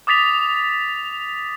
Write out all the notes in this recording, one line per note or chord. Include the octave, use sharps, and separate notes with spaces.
D6 D#6 A6 B6 F7